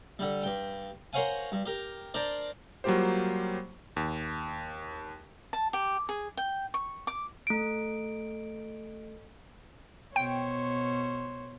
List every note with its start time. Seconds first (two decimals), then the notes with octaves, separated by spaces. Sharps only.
0.19 D3 G3
0.42 G2 G5
1.13 A#4 C5 C#5 F5 F#5 G#5
1.52 G2
1.66 G4 A#4
2.14 D4 A#4 C5 D5
2.84 F#3 G3 A#3 F4 G4 C5
3.96 D#2
5.53 A5
5.73 G4
6.09 G#4
6.37 G5
6.74 C#6
7.07 D6
7.47 A3 D7
10.16 B2 C5 C#5 G5